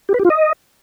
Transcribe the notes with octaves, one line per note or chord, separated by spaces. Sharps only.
G4
B4
G4
F4
D#5